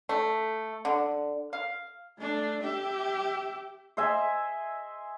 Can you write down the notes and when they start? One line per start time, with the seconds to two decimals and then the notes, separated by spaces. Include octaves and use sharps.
0.09 A3
0.85 D3
1.53 F5
2.19 A3 D4
2.62 G4 E5
3.97 C5 D#5 E5 G#5